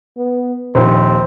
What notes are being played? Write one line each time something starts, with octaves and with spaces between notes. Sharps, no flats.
B3
A#1 D#2 C4